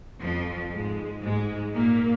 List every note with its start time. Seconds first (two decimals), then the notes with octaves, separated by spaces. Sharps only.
0.21 F2 F3
0.71 G#2 G#3
1.22 G#2 G#3
1.74 A#2 A#3